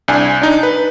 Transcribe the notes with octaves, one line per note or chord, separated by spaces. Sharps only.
C2 D4 G#5
D4 D#4
B4